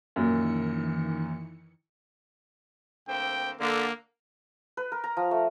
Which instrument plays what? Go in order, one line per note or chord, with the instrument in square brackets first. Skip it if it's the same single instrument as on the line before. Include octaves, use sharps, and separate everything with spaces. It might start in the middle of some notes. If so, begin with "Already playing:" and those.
[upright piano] F#2 A#2 [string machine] D#3 E3 C#7
[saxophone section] D2 A#3 C4 [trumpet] G5
[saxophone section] D3 [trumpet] A#3
[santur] B4
A#4
A#5
F3
A3